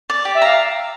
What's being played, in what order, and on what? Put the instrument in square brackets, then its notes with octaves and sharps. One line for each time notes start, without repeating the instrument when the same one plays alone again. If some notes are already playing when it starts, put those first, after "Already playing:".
[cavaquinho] D5
G4
[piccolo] E5
[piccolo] F5 [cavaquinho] A#5